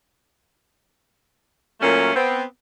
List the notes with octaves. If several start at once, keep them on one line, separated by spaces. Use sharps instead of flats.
A#2 F#3 A3 A#3 C#4
B3 C4